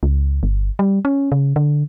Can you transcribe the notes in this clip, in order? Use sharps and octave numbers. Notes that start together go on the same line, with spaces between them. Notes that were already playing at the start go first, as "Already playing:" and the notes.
C#2
G1
G3
C#4
C#3
D3